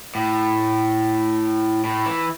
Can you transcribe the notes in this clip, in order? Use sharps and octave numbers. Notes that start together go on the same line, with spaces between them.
A2
A2
E3